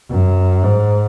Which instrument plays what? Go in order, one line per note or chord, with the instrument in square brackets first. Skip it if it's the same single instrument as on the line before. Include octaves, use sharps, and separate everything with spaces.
[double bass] F#2
G#2